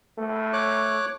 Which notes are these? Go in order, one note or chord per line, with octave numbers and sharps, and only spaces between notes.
A3
C#5 D6 F#6